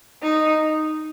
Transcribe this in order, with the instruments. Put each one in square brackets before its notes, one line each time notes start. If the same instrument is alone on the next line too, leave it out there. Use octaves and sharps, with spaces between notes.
[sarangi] D#4